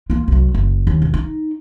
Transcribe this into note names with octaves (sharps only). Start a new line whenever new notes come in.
A#3 F4
C2 F#3
F#1
D#2
C3
D#4